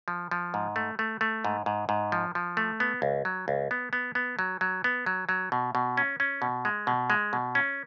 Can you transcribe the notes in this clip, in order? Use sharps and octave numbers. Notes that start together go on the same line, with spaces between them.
F3
F3
G#2
A3
A3
A3
G#2
G#2
G#2
F3
F3
A3
B3
C#2
F#3
C#2
B3
B3
B3
F#3
F#3
B3
F#3
F#3
B2
B2
C#4
C#4
B2
G#3
B2
G#3
B2
C#4